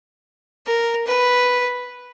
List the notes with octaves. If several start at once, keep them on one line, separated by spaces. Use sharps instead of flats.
A#4
B4